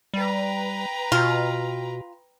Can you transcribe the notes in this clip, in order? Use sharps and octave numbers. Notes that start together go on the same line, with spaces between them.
G3 B4 G5 A#5
B2 F4